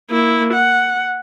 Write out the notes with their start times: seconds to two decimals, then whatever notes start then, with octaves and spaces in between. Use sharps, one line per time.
0.10 A#3 E4
0.54 F#5